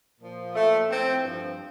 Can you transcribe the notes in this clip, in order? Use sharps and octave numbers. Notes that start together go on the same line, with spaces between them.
A#2 F3
A#2 F3 A3
A2 F3 C4
G2 F3